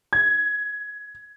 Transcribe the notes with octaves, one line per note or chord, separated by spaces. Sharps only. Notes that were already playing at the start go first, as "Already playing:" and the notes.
G#6